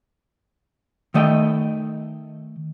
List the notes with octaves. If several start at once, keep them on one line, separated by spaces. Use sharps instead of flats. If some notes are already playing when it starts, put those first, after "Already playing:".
D#3 A3 D#5 F#5 G5